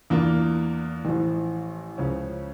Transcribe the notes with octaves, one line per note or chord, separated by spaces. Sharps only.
E2 E3 A#3 D4 F4
A1 A2 F3
C#2 C#3 F3 C#4